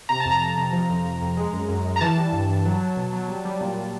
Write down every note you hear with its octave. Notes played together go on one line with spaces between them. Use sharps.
C3 A#5
F2 A5
A#5
F2
C3
F3
F2
F2
F2
G#3
F#2
F#2
G#3
A#5
E3 A5
G3
G2
G2
F#3
F#3
B2
F#3
G3
G3
A#2
A#2